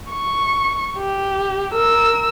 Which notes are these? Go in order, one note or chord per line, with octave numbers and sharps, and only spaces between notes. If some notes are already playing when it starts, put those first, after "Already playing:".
C#6
G4
A#4 E6